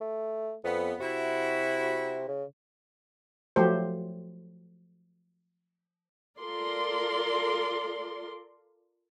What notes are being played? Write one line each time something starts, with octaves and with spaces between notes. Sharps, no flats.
A3
F2 B3
C3 E4 F#4
C#3
F3 F#3 A3 G4 C5
F4 A4 A#4 D5 C6